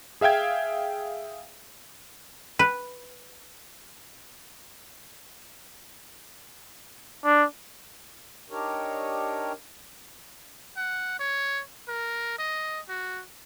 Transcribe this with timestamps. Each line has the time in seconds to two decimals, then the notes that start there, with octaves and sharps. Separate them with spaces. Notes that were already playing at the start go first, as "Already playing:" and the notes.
0.21 G#4 E5 F5 G5 G#6
2.59 B4
7.25 D4
8.50 D4 D#4 G4 A#4 C#5
10.77 F#5
11.19 C#5
11.88 A#4
12.39 D#5
12.88 F#4